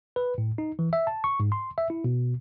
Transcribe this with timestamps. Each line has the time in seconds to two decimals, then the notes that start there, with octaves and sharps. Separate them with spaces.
0.16 B4
0.38 A2
0.58 D#4
0.79 E3
0.93 E5
1.07 A5
1.24 C#6
1.40 G#2
1.52 C6
1.78 E5
1.90 E4
2.04 B2